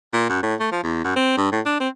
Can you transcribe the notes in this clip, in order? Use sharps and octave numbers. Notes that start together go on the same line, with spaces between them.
A#2
F#2
A2
A3
F3
E2
F#2
C4
G2
A2
D4
C4